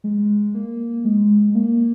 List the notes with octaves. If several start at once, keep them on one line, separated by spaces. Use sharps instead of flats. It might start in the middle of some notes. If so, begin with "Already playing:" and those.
G#3
A#3
G#3
A#3